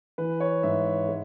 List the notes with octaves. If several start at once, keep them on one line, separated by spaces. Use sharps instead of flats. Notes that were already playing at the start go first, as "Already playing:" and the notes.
E3 B4
C#5
G#2 E5
E5
G#3